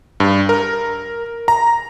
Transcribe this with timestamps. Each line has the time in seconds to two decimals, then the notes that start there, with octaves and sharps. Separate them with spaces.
0.20 G2
0.49 A#4
1.48 A#5